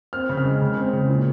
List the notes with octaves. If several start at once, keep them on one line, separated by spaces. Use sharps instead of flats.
C4 F6
C#3
F6
G#3
C#3
C4
C#3
A#2